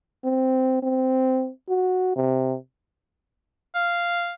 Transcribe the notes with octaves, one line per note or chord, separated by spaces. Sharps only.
C4
C4
F#4
C3
F5